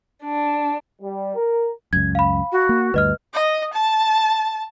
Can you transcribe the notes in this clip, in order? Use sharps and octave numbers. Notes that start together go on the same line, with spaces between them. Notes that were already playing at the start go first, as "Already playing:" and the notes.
D4
G3
A#4
C#2 F#2 G#6
F5 B5
F#4
A#3
D2 G2 B4 D#5 F6
D#5
A5